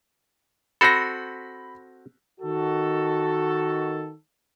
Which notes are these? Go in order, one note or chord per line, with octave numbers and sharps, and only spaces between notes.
C4 F#4 A4 B5 A#6
D#3 F#4 A4